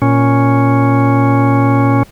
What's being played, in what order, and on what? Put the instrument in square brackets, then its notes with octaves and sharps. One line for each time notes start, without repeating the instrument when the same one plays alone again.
[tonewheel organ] A#2 C#4